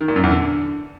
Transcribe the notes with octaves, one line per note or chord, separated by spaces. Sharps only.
D#3
A#2
F#2
E2
D3